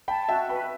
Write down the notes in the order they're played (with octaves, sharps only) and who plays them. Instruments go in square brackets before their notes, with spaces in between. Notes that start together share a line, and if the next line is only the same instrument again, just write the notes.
[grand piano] G5 B5 [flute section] A5
[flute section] F#4 [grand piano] E5 G5
[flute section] B4 [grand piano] G5 B5